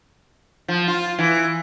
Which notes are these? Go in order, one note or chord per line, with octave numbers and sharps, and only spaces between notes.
F3
F4
E3